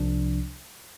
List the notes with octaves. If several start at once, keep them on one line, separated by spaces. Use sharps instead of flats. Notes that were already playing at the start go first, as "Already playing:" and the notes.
Already playing: C2 C3 F3 D4